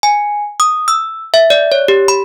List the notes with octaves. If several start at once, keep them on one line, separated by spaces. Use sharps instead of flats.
G#5
D#6
E6
E5
D5
C#5
G4
B5